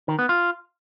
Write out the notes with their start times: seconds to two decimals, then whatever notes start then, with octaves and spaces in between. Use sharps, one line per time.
0.08 D#3
0.19 B3
0.29 F4